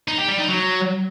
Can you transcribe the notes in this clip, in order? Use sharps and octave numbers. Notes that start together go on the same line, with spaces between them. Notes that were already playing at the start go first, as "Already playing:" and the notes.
D#4
G4
G3
D#4
F#3